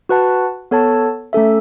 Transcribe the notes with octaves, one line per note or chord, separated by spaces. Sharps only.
F#4 B4 F#5 A5
B3 A4 C#5 A5
A3 C#4 A4 E5